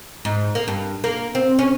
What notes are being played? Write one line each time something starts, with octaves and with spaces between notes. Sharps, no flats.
G#2
A#3
G2
A#3
C4
C#4